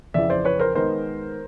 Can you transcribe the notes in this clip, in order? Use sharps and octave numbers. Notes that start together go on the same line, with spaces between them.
F2 C#3 E3 D5 E5
C5 D5
B4 C#5
A#4 C5
D#3 G#3 B3 D#4 A#4 C5